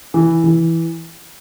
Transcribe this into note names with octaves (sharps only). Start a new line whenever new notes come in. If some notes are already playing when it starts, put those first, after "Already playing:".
E3
E3